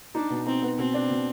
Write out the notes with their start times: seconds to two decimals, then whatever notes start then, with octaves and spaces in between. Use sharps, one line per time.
0.15 D4 D#4
0.30 B2
0.46 C4 D#4
0.63 B3
0.78 B2 C4
0.94 D4
1.10 B2